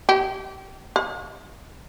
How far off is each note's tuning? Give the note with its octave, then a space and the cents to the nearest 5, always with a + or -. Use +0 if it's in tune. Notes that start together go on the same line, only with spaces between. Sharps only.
G4 -30
F5 +40